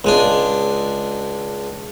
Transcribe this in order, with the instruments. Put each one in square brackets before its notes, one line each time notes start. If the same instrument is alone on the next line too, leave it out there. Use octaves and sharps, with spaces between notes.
[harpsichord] C#2 G#3 D4